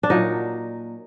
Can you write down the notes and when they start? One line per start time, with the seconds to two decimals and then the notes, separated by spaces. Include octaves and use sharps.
0.03 D4
0.10 A#2 F#3 D#4